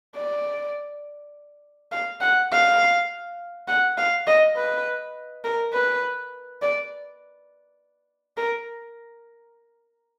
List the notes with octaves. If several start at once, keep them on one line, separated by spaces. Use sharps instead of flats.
D5
F5
F#5
F5
F#5
F5
D#5
B4
A#4
B4
D5
A#4